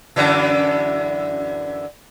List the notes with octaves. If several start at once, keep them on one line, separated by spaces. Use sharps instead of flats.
F#2 D3 E3